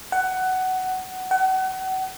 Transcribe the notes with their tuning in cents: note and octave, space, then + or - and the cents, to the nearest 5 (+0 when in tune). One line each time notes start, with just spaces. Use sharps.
F#5 +15
F#5 +35